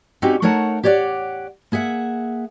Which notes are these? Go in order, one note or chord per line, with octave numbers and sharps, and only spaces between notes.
C4 C#4 D#4 F#4 G4
A3 D#4 A#4 C#5 F#5 A5
G4 C#5 D5 F5 F#5
A#3 G#4 E5 F#5